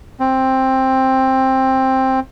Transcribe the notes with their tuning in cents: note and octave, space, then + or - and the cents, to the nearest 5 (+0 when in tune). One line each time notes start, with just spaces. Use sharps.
C4 +10